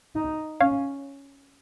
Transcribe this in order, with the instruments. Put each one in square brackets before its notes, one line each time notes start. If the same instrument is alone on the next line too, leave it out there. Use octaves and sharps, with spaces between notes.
[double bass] D#4
[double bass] C#4 [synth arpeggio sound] C#5 F5